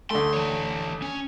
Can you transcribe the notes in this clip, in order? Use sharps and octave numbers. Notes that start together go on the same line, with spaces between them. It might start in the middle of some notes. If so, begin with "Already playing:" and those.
D2 A3 C6
E3 C#5
C#4